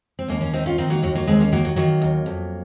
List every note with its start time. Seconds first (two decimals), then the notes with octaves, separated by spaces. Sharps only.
0.19 C4
0.28 D#2 A#3 C#4
0.41 A#3 C#4
0.53 D#3 C4 D#4
0.66 C#4 F4
0.78 D#3 C4 D#4
0.90 F#3 A#3
1.03 D#2 F#3
1.15 F#3 A#3
1.27 D#2 G#3 C4
1.40 A#3 C#4
1.52 D#3 F#3 A#3
1.65 F#3
1.76 D#3 F#3 A#3
2.02 D#2
2.26 F2